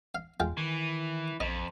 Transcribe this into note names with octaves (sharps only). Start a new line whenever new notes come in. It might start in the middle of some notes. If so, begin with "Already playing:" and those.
F5
E2 G#3 F4 G5
D#3 E3
A#1 F2 D#5